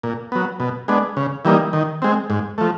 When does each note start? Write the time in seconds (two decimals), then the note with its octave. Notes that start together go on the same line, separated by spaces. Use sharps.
0.03 A#2
0.32 F#3 B3
0.60 B2
0.88 G#3 B3 D4
1.17 C#3
1.45 E3 G3 A#3 D#4
1.73 D#3
2.02 G#3 C4
2.30 G#2
2.58 F3 A3